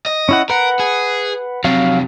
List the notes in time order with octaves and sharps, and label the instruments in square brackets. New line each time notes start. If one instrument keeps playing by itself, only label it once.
[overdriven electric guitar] D#5
[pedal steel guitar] C#4 E4 F#5
[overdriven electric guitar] A#4 [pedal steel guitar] B4 F#5
[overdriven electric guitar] G#4
[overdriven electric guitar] F2 C3 [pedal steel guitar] F#3 F5